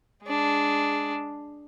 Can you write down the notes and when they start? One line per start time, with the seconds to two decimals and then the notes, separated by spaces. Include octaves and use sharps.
0.24 G#3 D4